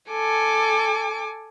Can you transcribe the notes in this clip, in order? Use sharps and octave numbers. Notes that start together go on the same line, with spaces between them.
A4 G#5 D6